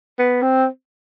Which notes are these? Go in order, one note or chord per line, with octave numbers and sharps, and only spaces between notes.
B3
C4